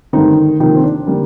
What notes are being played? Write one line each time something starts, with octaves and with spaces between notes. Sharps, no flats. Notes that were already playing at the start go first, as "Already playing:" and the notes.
G2 D3 D#3 A3 C4 D#4
C3 D#3 F3 A#3 D#4
C4
D4
D3 G3 A#3